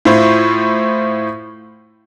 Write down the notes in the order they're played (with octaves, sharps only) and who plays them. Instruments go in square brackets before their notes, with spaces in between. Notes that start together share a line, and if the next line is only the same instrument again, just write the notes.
[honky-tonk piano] A2 [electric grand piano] E4 F4 C5